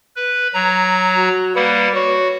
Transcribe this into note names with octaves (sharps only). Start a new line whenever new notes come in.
B4
F#3 A#5
F#4
G3 A#3 B4 F#5
F#4 C#5